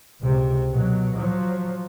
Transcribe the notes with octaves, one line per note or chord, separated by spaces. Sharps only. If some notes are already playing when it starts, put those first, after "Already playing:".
C#2 C3
B2 F#3
F3 F#3